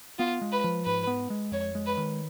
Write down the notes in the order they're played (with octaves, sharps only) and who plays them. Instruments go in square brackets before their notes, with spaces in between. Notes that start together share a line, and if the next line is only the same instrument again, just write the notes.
[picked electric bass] B3 [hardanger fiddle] F4
[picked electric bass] G#3
[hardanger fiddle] B4
[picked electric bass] F3
[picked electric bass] G#2 [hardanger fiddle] B4
[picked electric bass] B3
G#3
[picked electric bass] F2 [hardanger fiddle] C#5
[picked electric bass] G#3
[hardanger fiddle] B4
[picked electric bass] D#3